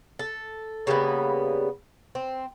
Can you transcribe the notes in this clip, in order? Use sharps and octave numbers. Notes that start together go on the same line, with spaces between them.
A4
C#3 G3 A#3 B3
C4